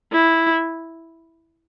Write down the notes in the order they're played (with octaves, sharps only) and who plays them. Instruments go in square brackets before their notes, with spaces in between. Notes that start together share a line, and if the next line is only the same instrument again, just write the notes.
[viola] E4